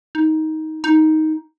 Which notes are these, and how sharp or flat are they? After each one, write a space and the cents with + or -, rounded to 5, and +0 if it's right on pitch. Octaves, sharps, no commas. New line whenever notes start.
D#4 +15
D#4 +10